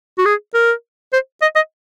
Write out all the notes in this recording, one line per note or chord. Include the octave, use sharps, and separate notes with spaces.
F#4
G#4
A#4
C5
D#5
D#5